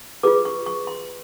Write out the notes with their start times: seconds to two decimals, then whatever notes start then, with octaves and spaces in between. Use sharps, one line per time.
0.23 F4 G#4 B4 D6
0.45 C#6
0.66 C#6
0.87 C6